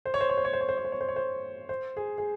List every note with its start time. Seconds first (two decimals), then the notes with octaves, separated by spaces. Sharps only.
0.05 C5
0.14 C#5
0.21 C5
0.29 C#5
0.37 C5
0.45 C#5
0.53 C5
0.61 C#5
0.68 C5
0.77 C#5
0.85 C5
0.92 C#5
1.01 C5
1.08 C#5
1.16 C5
1.69 C5
1.97 G#4
2.18 G#4